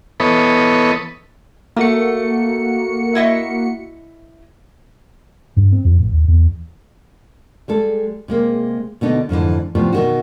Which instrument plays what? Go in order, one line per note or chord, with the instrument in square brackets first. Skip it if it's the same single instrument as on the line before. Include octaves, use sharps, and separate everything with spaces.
[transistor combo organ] E3 B3 A4 B4 C#5 D#5
[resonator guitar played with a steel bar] A3 [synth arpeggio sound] A#3 F#4 C#7
[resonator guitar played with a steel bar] E4 D#5 E5
[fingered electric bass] G2
C4
F2
A1
D#2
E2
[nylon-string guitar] G3 G#3 A4
C3 G#3 A#3
B2 D3 B3 D#4
F2 G#2 D3 E3
A2 C3 F3 G3 B3
B2 D#3 F#4